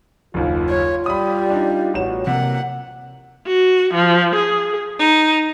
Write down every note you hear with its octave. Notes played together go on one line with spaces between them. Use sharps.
F#1 D#2 F4
C#5
G3 B5 D#6
D4 D#4
A1 B2 F#4 C#5 E7
C3 E3 F#3 A#3 F#5
F#4
F3
G#4
D#4